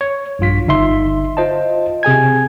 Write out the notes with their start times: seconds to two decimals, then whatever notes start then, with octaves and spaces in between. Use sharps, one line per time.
0.01 C#5
0.39 A#1 G2 F4 B6
0.67 G1 D#4 E5 C6
1.37 F4 C5 D#5 A5
2.03 C3 G#4 G#5 G#6